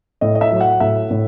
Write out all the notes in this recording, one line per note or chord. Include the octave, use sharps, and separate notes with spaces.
A2 D#5
D#5
E5
F#3
F#5
A2 E5
A2